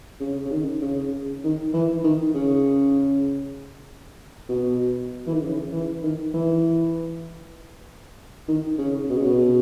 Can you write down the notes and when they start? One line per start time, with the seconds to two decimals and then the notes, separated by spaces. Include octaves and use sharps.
0.20 C#3
0.45 C#3
0.51 D#3
0.82 C#3
1.44 D#3
1.74 E3
2.04 D#3
2.35 C#3
4.49 B2
5.27 E3
5.34 D#3
5.41 C#3
5.72 E3
6.03 D#3
6.34 E3
8.48 D#3
8.79 C#3
9.09 B2
9.16 C#3
9.24 B2